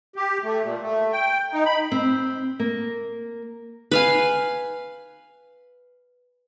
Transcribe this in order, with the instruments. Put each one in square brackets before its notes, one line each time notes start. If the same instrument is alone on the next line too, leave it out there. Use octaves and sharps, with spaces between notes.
[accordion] G4
A3
A#2
A3
G5
D#4
B5
[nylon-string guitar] C4
A#3
[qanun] B4 F5 G#5